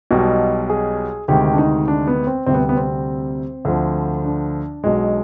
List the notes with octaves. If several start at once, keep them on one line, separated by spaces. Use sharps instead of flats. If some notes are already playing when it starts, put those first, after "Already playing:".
B1 B2 G3
G#4
D2 C3 D#3 G#3 G4
D4
D#4
D4
B3
C4
D2 C3 G3 C4
B3
B3
C4
D2 D3 F3
D4
B1 B2 G#3